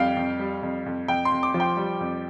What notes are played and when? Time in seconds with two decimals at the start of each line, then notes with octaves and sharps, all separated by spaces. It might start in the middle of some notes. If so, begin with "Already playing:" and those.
Already playing: F2 G3 F5 G5
0.17 F2
0.40 G3
0.63 F2
0.86 F2
1.08 F2 G5
1.25 C6
1.32 F2
1.43 D6
1.54 F3
1.60 G5
1.77 G3
2.00 F2